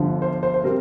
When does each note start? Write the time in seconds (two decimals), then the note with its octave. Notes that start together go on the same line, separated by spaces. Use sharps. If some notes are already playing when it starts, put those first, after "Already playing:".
Already playing: G1 G2 D3 F3
0.22 C5
0.43 C5
0.54 C5
0.64 C3 G3 C4 A#4